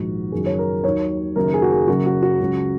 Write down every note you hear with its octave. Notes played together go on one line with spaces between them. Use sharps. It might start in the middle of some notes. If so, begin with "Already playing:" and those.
Already playing: A#1 G#2 D#3 F#4
F#1 F#2 D#3 F#3 G#4
C#5
A#4
D#2 D#3 F#3 C#5
F#1 F#2 D#3 F#3 A#4
G#4
F#4
G#4
F#1 F#2 C#3 F#3 F#4
F#4
F#4
C#2 C#3 F#3